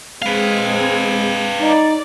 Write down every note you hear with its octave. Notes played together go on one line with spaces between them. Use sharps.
G#3 C4 G#4 B4 F5
D#4 D5